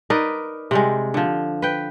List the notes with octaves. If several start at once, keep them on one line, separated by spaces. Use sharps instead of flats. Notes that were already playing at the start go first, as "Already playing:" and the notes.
D#4 A#4 B4 D5
C3 G3 G#3
D3 F3
B4 G5